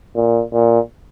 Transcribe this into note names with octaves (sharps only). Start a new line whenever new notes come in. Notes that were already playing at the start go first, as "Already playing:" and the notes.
A#2
A#2